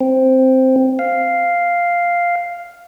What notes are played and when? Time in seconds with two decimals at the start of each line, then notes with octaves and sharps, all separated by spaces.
0.01 C4
0.99 F5